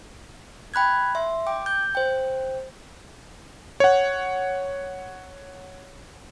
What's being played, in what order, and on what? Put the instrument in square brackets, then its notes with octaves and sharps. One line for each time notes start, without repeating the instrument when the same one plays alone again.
[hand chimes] G5 B5 F#6 G#6
E5 C6
G5 D6
G6
C5 G5
[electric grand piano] C#5 F#5